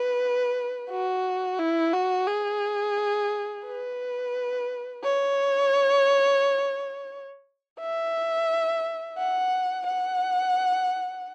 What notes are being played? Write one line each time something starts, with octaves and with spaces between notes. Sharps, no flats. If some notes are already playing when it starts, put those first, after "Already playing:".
Already playing: B4
F#4
E4
F#4
G#4
B4
C#5
E5
F#5
F#5